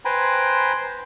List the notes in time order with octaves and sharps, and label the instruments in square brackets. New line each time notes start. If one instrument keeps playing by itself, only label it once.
[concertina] B4 C5 G5 G#5 A#5 B5